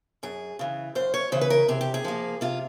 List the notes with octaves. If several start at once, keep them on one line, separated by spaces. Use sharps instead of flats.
F#2 G#4
C#3 E3
F#2 C5
C#5
C#3 E3 C5
B4
A#4
C3 G#4
G4
G#4
F3 A#3
C3 F4